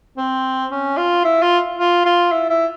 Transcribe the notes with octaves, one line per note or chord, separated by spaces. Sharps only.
C4
C#4
F4
E4
F4
F4
F4
E4
E4